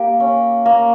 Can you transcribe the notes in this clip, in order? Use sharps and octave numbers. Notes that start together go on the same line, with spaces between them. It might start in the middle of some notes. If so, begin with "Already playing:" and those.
Already playing: A#3 G4
C#4
A#3